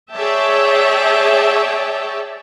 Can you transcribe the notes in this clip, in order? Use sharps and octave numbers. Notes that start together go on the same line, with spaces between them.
G#4 C#5 D5 E5 G5 A5